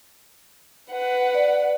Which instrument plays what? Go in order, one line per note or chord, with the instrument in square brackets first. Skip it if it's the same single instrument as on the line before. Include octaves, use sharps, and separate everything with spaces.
[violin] B4 F#5
[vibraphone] D5